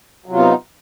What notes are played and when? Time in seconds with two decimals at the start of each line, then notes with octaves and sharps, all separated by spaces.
0.26 F#3
0.29 C3
0.33 F4
0.36 B3
0.39 D#4